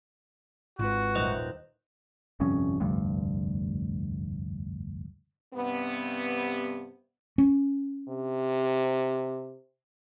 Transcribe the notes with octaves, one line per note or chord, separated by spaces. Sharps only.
G#1 F4 F#4 B4
D#1 D#2 C5 D#5 F#6
G1 C2 F2 C#4
F1 D2 G2
G2 C3 B3
C#4
C3